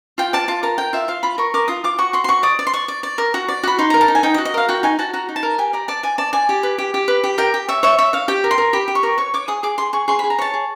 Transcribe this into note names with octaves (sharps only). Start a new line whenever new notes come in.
F4 G5
D5 A5
F4 A5
A#4 A5
A#4 G5
F4 E5
F4 F5
F4 B5
A#4 C#6
A#4 D6
F4 D#6
F4 D6
F#4 C#6
F#4 C6
C6
F#4 C#6
D5 D#6
D5
C6
D5 C#6
D5
D5
A#4
F#4
D5
F#4 B5
D#4 C6
A#4 A#5
A5
D#4
G#5
D#4 G5
D#5
F#4
D#5
A#4 F5
F#4 G5
D#4 G#5
F#4 A5
F#4 A#5
D#4
A5
A#4
G4 G#5
D5 A#5
D5 A5
D5 G#5
D5 A5
D5 G#5
G4
B4
G4
G4
B4
G4
A#4 G5
G4
C#5 E5
C#5 E5
C#5 E5
C#5 F5
G4 G5
A#4
C6
A#4
G4 B5
G4
C#6
A#4
C#5 C#6
C#5 D6
G#4 D#6
G#4 D6
G#4 C6
G#4 C#6
G#4 C6
G#4 B5
A#5
C#5 A5
G#4